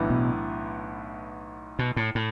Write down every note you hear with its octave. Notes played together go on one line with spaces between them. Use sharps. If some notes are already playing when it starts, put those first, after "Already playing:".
Already playing: B1 A2 E3 B3 D4
B2
B2
A2
A2